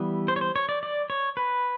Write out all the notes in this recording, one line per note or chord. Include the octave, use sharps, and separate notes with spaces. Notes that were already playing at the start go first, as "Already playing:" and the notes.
Already playing: E3 G3 B3
C5
C#5
C5
C#5
D5
D5
C#5
B4